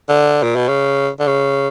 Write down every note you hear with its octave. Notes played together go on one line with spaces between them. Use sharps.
D3
A#2
B2
C#3
D3
C#3